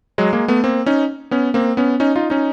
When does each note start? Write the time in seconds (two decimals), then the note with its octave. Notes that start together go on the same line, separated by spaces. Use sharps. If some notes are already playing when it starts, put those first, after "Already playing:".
0.18 F#3 G#3
0.33 G#3 A#3
0.48 A3 B3
0.64 A#3 C4
0.86 C#4 D#4
1.31 B3 C#4
1.54 A#3 C4
1.77 B3 C#4
2.00 C#4 D#4
2.16 D#4 F4
2.30 C#4 D#4